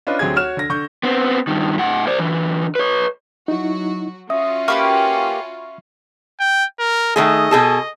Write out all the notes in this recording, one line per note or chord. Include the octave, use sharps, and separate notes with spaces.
C#4 D4 F4 B4 D#5
D2 F#3 C4 G4 G#4 G#6
F#4 C#5 F6 E7
D3 A#6
D3 C#6 G6
B3 C4
G2 D#3
A2 F#5
C5 D5
D3 E3
B4 C#5
F#3 D#4 E4 F#4
C#4 F4 F#4 E5 D#6
A#3 G4 B4 B5 C#6 F6
G5
A#4
D#3 A3 G#4 D#5
B2 G#4 A4